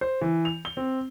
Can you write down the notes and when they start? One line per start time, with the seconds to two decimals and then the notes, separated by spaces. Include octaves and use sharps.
0.01 C5
0.21 E3
0.45 F7
0.65 G7
0.77 C4